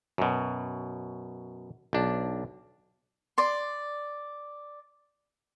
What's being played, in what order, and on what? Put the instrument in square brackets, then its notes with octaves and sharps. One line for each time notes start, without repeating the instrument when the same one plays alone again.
[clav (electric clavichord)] F#2 B2
B1 D4
[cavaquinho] D5 C6